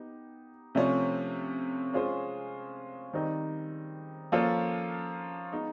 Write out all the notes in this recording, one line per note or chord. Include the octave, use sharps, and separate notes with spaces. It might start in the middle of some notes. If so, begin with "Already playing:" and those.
Already playing: B3 D#4 G4
C3 F3 A3 C#4 F4
G#3 C#4 F4 G#4 C5
D#3 G3 C4 D#4
F3 A#3 C#4 F4 A4
G#3 B3 D#4